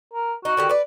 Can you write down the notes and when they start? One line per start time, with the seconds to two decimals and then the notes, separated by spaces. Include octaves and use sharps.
0.14 A#4
0.45 D#4 F#4
0.57 D3 D#3 G4
0.69 B4 D5